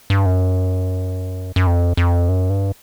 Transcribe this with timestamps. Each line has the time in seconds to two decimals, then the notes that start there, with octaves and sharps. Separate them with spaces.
0.10 G2
0.26 F#2
1.56 F#2
1.67 F2
1.97 F2
2.29 F#2
2.50 G2